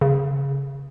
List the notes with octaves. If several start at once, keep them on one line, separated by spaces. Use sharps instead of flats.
C#3